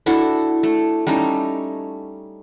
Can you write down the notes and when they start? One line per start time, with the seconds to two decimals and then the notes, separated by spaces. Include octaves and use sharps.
0.06 D4 E4 F#4 A4
0.63 A3
1.07 G3 A3 C#4 D#4